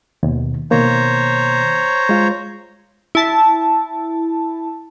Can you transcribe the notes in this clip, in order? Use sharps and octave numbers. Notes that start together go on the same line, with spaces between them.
D#2 B2
B2 D#3 A#3 C5 C#5 A#5
G#3 F4
E4 A5